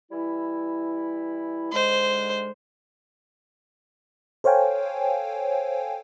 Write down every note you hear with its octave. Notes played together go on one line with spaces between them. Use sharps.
E3 G3 E4
G#2 D3 G#3 C5
A4 C5 C#5 F5 G5 G#5